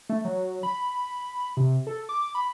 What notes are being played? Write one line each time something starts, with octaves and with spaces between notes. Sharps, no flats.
A3
F#3
B5
C3
A4
D6
B5